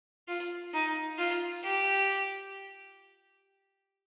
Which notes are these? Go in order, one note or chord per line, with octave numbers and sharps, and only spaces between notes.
F4
D#4
F4
G4